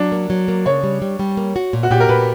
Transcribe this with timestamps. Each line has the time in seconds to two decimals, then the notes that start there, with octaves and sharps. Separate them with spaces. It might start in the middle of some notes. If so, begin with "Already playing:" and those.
Already playing: F#3 D4
0.12 A#3
0.30 F#3
0.48 A#3
0.66 C#3 C#5
0.83 G3
1.02 G3
1.19 G3
1.37 A#3
1.56 F#4
1.73 A#2
1.83 F#4
1.91 A#2 G4
2.00 A#4
2.09 A#2 B4